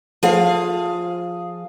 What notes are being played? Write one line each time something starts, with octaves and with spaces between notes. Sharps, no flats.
F3 G#4 F5